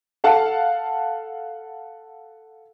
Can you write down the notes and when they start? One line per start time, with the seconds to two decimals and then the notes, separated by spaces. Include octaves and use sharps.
0.24 A4 F5 F#5 A5